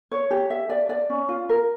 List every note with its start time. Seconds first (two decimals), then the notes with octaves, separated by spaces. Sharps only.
0.11 C#5
0.31 G4
0.50 E5
0.70 D5
0.89 D5
1.10 C#4
1.29 F4
1.49 A#4